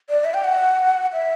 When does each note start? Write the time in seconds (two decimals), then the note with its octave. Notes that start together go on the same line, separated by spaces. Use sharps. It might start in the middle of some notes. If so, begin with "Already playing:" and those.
0.09 D5
0.25 E5
0.34 G5
0.44 F#5
1.13 E5